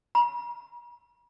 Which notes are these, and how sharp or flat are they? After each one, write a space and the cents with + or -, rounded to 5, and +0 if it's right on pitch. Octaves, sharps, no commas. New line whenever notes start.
A#5 +45